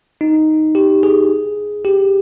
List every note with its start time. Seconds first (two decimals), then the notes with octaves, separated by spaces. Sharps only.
0.21 D#4
0.75 G4
1.03 G#4
1.85 G4